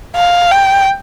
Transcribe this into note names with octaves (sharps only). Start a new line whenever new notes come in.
F5
G5